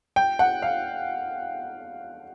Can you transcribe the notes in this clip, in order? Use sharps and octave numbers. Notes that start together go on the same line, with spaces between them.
G5
F#5
F5